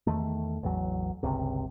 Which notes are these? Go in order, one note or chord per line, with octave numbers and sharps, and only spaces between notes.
E2 D#3 A3
A1 E2 F#3
G1 C#2 C3